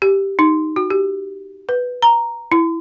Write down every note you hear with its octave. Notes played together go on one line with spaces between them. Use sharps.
G4
D#4
F#4
G4
B4
A#5
E4